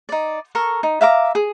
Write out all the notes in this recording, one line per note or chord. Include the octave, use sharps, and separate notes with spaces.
D#4 D5
A4 A#4 C#6
D#4
E5 F5 A#5 D6
G#4